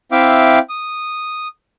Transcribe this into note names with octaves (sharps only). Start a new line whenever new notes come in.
C4 E4 E5 F5 G5 D6
D#6